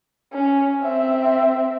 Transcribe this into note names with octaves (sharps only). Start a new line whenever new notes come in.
C#4
C4 E5